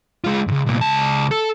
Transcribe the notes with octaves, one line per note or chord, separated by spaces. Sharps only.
G#3 F4
C#2 G#2
C2 A#2
C#2 A5
A4